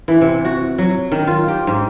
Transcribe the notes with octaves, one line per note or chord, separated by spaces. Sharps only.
E3
C3
F#4
F#3
D#3
F4
G4
G#2